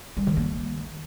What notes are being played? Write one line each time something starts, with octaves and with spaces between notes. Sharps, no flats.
G3
D#3
A#3